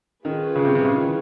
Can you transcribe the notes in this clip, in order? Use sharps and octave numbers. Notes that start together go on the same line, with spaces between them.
D#3 C#4 F4 G#4 B4
C#3
C3
C3
C#3
D#3
E3